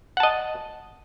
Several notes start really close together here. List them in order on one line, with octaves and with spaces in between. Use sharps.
F#5 A5 D#5